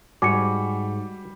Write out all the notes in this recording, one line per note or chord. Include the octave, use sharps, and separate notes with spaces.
G#2 G3 F#4 G#5 D6 C#7